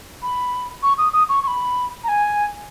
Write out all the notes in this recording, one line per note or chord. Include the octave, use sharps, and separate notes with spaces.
B5
C#6
D#6
D#6
C#6
C#6
B5
A#5
G#5